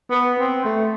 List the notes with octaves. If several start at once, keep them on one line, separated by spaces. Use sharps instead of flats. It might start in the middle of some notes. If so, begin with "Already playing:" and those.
B3
C4
A3